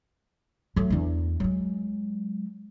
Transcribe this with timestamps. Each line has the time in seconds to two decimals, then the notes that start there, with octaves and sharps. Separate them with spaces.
0.76 F#3 A3
0.90 E2 D4
1.40 F#3 G#3